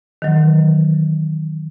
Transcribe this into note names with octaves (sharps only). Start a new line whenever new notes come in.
D#3 E3 F#3